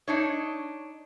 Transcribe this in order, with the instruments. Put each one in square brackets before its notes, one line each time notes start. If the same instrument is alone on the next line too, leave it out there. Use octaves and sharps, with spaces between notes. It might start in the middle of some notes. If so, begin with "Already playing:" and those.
[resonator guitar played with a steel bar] D4 D#4 C#5